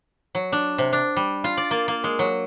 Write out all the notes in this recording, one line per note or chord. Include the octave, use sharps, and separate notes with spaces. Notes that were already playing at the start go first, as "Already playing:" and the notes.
F#3
D4
C3
D4
G3
F4
D5
A#3
A#3
G#3
F#3